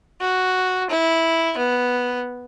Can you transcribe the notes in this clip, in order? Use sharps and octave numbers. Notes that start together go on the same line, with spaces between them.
F#4
E4
B3